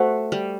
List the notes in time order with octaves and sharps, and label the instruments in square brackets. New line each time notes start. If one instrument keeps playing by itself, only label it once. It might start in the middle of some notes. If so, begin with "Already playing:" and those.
Already playing: [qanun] A3 [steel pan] F#4 C5 F#5
[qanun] G3